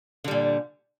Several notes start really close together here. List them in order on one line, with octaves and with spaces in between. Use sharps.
D3 G3 A#2